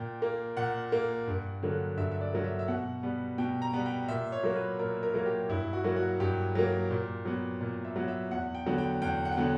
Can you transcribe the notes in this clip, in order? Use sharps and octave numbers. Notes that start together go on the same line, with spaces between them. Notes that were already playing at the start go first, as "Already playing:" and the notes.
Already playing: A#2 G5
A#3
A#2 F#5
A#3
G2
D3 F#3 A#3
G2 E5
E5
D5
D3 F#3 A#3
E5
E5
B2 F#5
G3 B3
B2 G5
A#5
G3 B3
G5
A#2 E5
C#5
F#3 A#3
B4
A#2 A#4
A#4
F#3 A#3
A#4
G4
G2 E4
F#4
F#3 A#3
F#4
G2 G4
F#3 A#3
A#2
F#3 B3
A#2
E5
F#3 B3
E5
E2 F#5
G5
D3 F#3 B3
G5
E2 G5
F#5
G5
D3 F#3 B3 F#5